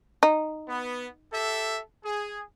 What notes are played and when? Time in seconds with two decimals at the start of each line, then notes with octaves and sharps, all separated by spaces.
0.23 D#4
0.67 B3
1.33 G4 A4 E5
2.05 G#4